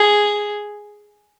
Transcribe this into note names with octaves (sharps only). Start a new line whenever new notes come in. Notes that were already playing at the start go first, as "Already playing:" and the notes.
Already playing: G#4